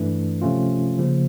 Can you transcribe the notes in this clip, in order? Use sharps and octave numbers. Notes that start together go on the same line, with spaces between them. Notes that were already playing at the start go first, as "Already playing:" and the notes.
Already playing: G2 E3 A3 D4
C3 F3 A3 C#4 F4
C#3 F3 A#3